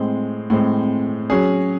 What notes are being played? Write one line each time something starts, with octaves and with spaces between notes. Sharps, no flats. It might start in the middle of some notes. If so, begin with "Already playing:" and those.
Already playing: A2 G#3 C4
A2 G#3 C4
F#3 C#4 G#4